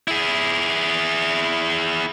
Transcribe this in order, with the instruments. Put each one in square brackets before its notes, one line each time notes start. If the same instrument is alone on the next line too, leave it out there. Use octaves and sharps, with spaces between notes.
[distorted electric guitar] E4 G#4